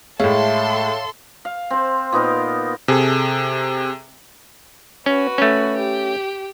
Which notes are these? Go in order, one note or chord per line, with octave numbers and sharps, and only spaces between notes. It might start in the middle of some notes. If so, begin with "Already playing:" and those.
A2 G#3 A3 A4 C#5 F5 C6
F5
C4 C5
A#2 B3 D#4 A#4
C3 G#4 A4
C#4 F#4 B4
A3 C#4
G4